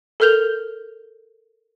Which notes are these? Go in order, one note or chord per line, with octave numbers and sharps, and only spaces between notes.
A4 A#4 F6 G6 F7 G7